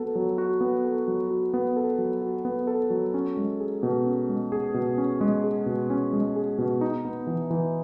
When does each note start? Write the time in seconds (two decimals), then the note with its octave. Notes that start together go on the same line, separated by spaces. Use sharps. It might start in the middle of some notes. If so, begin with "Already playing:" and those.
Already playing: B3 F#4 A4
0.15 F#3
0.38 F#4
0.61 B3
0.84 A4
1.08 F#3
1.30 F#4
1.54 B3
1.77 A4
1.98 F#3
2.22 F#4
2.45 B3
2.67 A4
2.90 F#3
3.14 C#4
3.37 G#3
3.60 G#4
3.83 B2
4.05 C#4
4.29 G#3
4.52 G#4
4.74 B2
4.98 C#4
5.21 G#3
5.44 G#4
5.66 B2
5.90 C#4
6.13 G#3
6.36 G#4
6.58 B2
6.81 D#4
7.05 B3
7.27 E3
7.50 E3